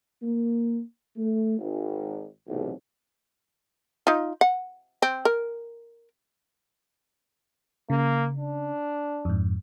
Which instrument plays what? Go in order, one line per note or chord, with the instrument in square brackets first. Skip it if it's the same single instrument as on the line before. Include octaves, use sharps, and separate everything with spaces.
[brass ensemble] A#3
A3
G#1
B1 E2 A2 C3
[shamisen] D#4 F4
F#5
C4
A#4
[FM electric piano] C#3 [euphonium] A#3
[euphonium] D4
[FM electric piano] F2 G#2